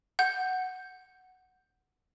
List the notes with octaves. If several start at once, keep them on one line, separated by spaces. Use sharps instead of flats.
F#5 G6